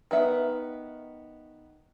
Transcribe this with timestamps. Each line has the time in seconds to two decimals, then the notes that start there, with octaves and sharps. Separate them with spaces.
0.11 D#3 B3 E5